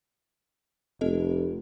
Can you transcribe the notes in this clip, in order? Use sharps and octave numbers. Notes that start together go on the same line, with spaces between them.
F1 C4 A4 D#5